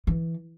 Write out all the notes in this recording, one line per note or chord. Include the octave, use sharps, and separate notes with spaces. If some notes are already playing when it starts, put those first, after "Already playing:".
E3